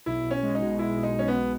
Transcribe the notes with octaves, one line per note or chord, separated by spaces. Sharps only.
B1 E4
B1
C#4
G#3
D#4
B2
B1 E4
B1
D#4
G#3 C#4
B3
B2